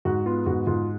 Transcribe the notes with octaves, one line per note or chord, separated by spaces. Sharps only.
G#2 F#4
B3 F4
G#2 F#4
G#2 F4